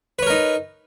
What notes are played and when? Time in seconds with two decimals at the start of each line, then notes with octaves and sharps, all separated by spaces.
0.19 B4
0.23 C#5
0.26 A#4
0.30 D#4